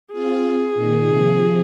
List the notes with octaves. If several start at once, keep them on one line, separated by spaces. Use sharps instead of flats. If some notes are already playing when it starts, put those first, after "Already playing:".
C4 F4 G#4
A#2 D#3
C3 F3